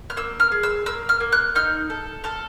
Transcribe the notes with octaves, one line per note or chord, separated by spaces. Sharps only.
F6
A#3 E6
F6
G#4
E6
A#3 E6
F6
A#3
F#6
D#4 F6
A4
A4 F6